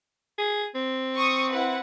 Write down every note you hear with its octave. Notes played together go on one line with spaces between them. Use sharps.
G#4
C4
C#6 D#6
E4 B4 F#5